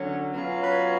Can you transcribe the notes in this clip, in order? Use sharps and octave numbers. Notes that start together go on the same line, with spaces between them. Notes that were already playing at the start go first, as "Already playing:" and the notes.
Already playing: D3 F#3 C#4
B2 F#3 C#4 F4
B4